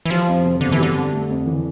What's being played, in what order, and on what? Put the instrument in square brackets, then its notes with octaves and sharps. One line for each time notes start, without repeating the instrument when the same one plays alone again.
[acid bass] E3
[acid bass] F3 [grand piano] G3
[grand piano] F2
C3
[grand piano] G1 [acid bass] D3
[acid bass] E3
[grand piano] G3
[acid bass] D3
[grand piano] F2
A3
F2
E3